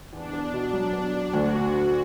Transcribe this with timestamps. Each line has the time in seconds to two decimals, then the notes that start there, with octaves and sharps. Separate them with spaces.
0.13 E2 D4
0.33 B3
0.54 B2
0.73 F#3
0.93 B3
1.14 D4
1.33 D2 F#4
1.53 F#4
1.74 F#4